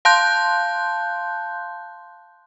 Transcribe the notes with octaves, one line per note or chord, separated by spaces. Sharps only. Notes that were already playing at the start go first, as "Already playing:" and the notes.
F5 A5 C6 F#6 G6